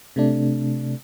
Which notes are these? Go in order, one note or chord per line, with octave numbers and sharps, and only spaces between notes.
C3 A3 D4